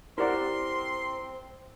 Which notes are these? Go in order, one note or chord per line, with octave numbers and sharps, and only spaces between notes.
C4 E4 G4 A#4 D5 F#5 C6